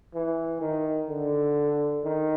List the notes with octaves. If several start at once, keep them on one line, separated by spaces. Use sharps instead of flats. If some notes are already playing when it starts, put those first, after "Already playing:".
E3
D#3
D3
D#3